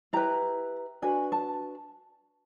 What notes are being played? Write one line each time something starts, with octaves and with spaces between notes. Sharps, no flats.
E4 G4 B4 A#5
D4 F#4 B4 G#5
A5